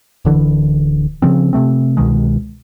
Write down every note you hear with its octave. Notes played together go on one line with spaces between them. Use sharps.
D1 D3 E3
C#3 F3 C4
C3 F3 A3 C4
C2 B2 D#3 G#3